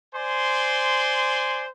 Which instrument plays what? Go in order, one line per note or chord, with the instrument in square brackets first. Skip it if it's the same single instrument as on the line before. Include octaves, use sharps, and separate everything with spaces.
[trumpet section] C5 D5 G#5 C6